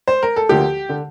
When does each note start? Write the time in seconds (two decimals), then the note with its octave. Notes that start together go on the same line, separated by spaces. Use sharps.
0.08 C5
0.23 A#4
0.36 A4
0.49 D2 D3 F3 A#3 G4
0.89 D3